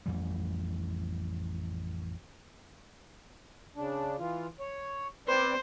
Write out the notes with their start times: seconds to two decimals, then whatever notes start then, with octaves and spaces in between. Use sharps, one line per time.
0.06 A1 F2 E3 G3
3.76 C#3 D4
4.19 E3 F4
4.60 C#5
5.28 C4 B4 C5 D5